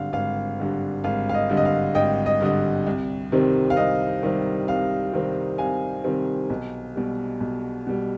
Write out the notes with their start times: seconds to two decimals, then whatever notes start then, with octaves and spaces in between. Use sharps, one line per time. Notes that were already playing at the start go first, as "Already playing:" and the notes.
Already playing: G#1 G2 D3 F5
0.13 G#1 F5
0.59 G2 D3
1.04 G#1 F5
1.29 F5
1.34 D#5
1.50 G2 D3
1.57 D#5
1.65 F5
1.95 G#1 D#5 G5
2.26 D#5
2.41 G2 D3 D#5
2.86 C2
3.32 C3 D#3 G3 C4
3.70 F5
3.77 C2 D#5
4.23 C3 D#3 G3 C4
4.68 C2 F5
5.13 C3 D#3 G3 C4
5.58 C2 F5 G#5
6.04 C3 D#3 G3 C4
6.50 B1
6.96 B2 G3
7.40 B1
7.87 B2 G3